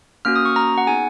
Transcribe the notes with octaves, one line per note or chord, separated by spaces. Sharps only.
A#3 C#4 F#4 F6
D#6
C#6
A#5
F#5
B3 D#4 G#4 G#5